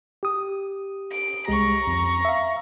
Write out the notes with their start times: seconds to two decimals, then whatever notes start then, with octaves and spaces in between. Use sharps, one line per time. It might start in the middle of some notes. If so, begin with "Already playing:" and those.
0.23 G4 D#6
1.12 D7
1.48 C2 G#3 G4 A#5 C#6
1.87 F2
2.25 E5 F5